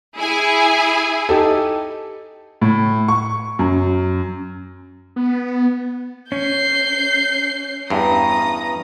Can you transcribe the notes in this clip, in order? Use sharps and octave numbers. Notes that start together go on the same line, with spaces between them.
E4 G#4 G#5
D#4 G4 A4
A2
C#6
F#2
B3
C#4 G6 C7
E2 G2 A#5 D#6